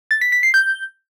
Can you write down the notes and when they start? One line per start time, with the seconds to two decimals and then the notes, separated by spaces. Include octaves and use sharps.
0.11 A6
0.21 B6
0.32 B6
0.43 C7
0.54 G6